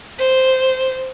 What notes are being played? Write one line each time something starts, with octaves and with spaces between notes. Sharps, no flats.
C5